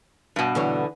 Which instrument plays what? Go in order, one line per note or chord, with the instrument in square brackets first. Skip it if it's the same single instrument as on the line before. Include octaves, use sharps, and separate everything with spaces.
[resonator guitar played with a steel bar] G2 B2
[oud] D3 E3 C#5